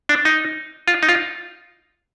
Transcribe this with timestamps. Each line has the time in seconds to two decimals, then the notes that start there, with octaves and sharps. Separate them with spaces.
0.09 D4
0.25 D#4
0.88 F4
1.03 D#4
1.09 F4